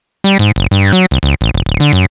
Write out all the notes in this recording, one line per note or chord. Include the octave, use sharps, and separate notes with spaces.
G3
G#2
F#1
G2
F#3
C2
C#2
A1
E1
D1
D3
F#2